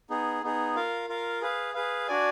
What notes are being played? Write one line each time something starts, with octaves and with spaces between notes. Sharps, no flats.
B3 D#4 G#4
B3 D#4 G#4
F4 A#4 F5
F4 A#4 F5
G#4 B4 F5
G#4 B4 F5
D4 F#4 D5 G#5